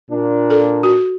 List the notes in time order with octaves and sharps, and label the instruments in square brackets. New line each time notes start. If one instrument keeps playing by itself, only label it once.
[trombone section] A#2 D4
[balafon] A4
F#4